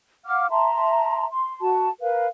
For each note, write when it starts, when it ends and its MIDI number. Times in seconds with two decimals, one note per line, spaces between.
0.25 0.47 77
0.25 0.47 78
0.25 0.47 86
0.25 0.47 89
0.50 1.25 76
0.50 1.25 81
0.50 1.25 82
0.50 1.25 84
1.31 1.59 84
1.61 1.90 66
1.61 1.90 81
2.01 2.27 70
2.01 2.27 71
2.01 2.27 77